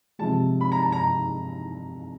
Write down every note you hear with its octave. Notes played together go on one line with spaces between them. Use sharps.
C3 F3 G#3 A5
B5
A#5
A5
A#5